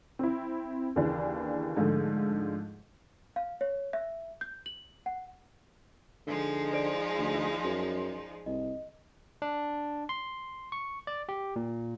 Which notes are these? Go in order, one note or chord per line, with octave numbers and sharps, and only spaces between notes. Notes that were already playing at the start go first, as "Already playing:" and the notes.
C4 E4
D#2 C#3 E3 D4
G#2 D3 F3 A3
F5
C#5
E5
G6
F#7
F#5
D3 F3 G#3 D#4
C5 D5 D7
D2
F#2
C2 D#5
D4
C6
C#6
D5
G4
A#2